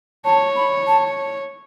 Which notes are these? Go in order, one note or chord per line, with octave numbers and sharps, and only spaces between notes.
C#5 A5
B5
A5